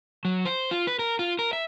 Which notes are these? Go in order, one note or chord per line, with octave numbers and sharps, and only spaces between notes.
F#3
C5
F4
B4
A#4
F4
A#4
E5